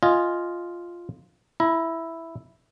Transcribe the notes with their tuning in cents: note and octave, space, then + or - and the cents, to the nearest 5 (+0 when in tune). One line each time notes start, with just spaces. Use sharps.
F4 +0 D#5 +0 G#5 +0
E4 +0 A#5 +30